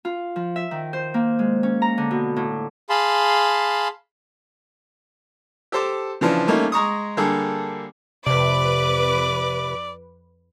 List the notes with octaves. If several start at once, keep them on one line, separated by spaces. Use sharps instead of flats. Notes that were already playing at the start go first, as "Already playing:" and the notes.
F4
F3
E5
D#3
C5
A#3
G#3
C#4
A#5
D3
B2
A2
G#4 F5 A5 B5 C6
G4 A4 C5 A5 D6
C#3 E3 F3 D4
G3 A3 A#3 C#4 D#4
G#3 A#5 C#6 D#6
D3 G3 A#3 G#4 A4
F2 C3 B4 D5 D6